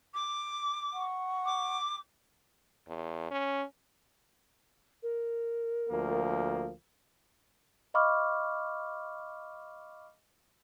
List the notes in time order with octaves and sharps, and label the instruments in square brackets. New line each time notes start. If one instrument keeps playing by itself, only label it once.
[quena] D6
[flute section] F#5 C#6
[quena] D6
[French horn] E2
C#4
[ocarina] A#4
[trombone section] D2 F3 A#3
[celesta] D#5 F5 B5 C#6 D6 F6